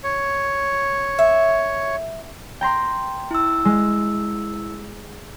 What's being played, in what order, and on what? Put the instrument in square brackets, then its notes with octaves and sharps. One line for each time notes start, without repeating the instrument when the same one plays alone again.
[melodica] C#5
[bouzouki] E5
[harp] G5 A#5 C6
[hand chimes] E4 E6
[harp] G#3